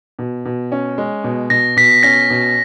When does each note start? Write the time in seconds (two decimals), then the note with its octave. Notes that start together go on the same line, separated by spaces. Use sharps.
0.19 B2
0.45 B2
0.72 C#4
0.98 G#3
1.24 B2
1.50 B2 A#6
1.77 B2 B6
2.03 C#4 A#6
2.30 B2